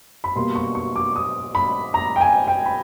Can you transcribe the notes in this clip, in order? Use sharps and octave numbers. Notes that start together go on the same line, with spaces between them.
B5
B2 G3 A#3 C6
C#6
C#6
D6
D#6
B5
A#5
G5
G#5
G5
B5